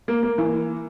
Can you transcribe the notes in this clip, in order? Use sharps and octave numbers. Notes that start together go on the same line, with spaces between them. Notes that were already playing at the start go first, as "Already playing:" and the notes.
A#3
A#3
E3